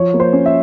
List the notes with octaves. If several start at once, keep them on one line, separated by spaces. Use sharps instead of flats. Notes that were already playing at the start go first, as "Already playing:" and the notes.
Already playing: F3 C#5
A#3
C5
C#4
E5